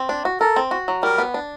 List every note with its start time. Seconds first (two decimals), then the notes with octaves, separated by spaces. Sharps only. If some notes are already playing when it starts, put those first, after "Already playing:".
Already playing: C4
0.09 D4
0.25 F#4
0.40 A4 A#4
0.56 C4
0.71 F#4
0.88 F#3
1.03 G3 A#4
1.18 B3
1.34 D4